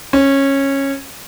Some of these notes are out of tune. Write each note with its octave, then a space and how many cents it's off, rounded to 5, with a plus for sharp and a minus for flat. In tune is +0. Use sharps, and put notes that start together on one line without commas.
C#4 -15